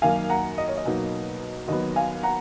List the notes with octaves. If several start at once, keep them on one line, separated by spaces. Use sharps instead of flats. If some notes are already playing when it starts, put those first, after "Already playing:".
F#2 D#3 A#3 F5 G#5
F#5 A#5
D#5
C#5
D#5
B2 F#3 A#3 D#4
D#2 D#3 F#3 B3 D#5
F5 G#5
F#5 A#5